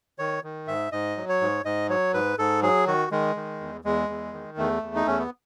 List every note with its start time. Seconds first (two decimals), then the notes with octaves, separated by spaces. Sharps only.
0.19 D#3 C#5
0.43 D#3
0.68 G#2 E5
0.92 G#2 D#5
1.17 F#3
1.29 C#5
1.41 G#2
1.65 G#2 D#5
1.89 F#3 C#5
2.14 G#2 B4
2.38 G#2 A4
2.63 F#3 G#4
2.87 D#3 F#4
3.11 D#3 G#3
3.36 D#3
3.61 E2
3.84 E2 G#3
4.09 E2
4.33 D#3
4.57 E2 A3
4.82 E2
4.95 D#4
5.06 E2 C#4
5.19 B3